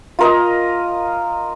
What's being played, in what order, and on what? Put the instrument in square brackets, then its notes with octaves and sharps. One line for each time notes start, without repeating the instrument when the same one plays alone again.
[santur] F4 A#4 D#5